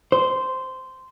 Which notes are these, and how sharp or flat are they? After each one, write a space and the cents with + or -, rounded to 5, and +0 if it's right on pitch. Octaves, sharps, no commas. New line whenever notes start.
C5 -10